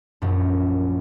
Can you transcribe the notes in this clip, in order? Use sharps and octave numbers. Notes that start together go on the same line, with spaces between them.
A#1 F#2